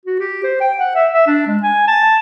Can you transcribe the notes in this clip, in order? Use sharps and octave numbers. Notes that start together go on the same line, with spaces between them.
F#4
G4
C5
G5
F#5
E5
E5
D4
G#3
G#5
A5